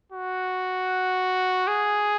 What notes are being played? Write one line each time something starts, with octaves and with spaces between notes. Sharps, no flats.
F#4
G#4